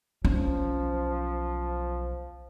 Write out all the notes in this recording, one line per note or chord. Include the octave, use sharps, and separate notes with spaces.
B1 F3 C#4